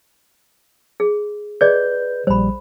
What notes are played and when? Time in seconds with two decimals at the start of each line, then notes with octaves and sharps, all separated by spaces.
1.00 G#4
1.61 G#4 B4 D5 D#5 G6
2.27 A#1 G3 C5 B5